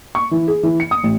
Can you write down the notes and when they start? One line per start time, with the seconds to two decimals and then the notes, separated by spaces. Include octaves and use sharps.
0.15 C#6
0.31 E3
0.48 G#4
0.63 E3
0.80 C#7
0.91 D#6
1.03 A1